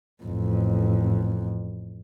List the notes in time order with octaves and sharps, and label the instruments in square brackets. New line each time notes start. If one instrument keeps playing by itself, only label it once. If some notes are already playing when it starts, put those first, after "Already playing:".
[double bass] A1 F2